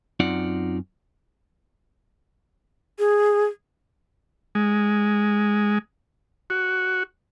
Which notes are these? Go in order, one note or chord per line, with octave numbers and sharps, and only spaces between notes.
F#2 C4 D#4 F4 D5 F#5
G#4
G#3
F#4